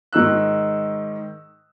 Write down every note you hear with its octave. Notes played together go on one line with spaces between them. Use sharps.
G#2 D#3 D#4 E6 F#6